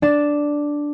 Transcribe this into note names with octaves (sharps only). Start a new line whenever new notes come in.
D4 E7